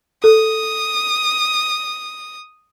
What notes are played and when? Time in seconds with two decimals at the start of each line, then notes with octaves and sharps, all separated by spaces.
0.24 A4 D#6